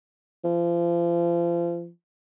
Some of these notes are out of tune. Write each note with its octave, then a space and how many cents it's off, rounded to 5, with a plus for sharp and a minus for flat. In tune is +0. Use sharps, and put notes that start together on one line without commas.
F3 -35